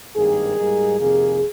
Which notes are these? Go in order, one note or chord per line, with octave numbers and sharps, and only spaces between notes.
G#1 G2 D#3 A#3 G#4
G#2 G3 A#3 D#4
F2 C3 D#3 A#3 G#4